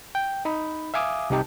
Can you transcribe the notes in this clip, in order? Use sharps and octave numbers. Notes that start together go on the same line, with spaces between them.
G5
D#4 B5
E5 F5 G#5 D6 D#6
C2 C3 D#4 G4 A5